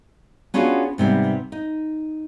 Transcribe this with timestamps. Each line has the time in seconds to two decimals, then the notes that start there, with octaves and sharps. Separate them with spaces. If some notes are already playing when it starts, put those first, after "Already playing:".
0.54 B3 C#4 D4 F4 F#4 G#4
0.98 G#2 C3 G3 B3
1.52 D#4